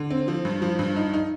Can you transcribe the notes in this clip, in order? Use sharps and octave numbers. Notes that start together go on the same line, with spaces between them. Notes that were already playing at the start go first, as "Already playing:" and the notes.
Already playing: D3
C4
F3
G2
F3
G2
D#4
D#4